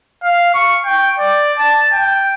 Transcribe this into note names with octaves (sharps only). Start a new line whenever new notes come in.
F5
C#6
G5
D5
A5
G5